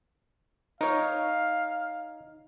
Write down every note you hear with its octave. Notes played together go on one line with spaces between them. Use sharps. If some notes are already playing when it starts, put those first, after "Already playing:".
D#4 A#4 C#5 F5